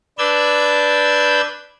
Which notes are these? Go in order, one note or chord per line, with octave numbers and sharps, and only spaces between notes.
D4 B4 D5 E6 G6 G#6